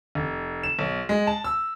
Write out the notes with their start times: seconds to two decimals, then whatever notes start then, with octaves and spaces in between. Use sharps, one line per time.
0.15 F1
0.63 E7
0.79 B1
1.09 G#3
1.27 A5
1.44 E6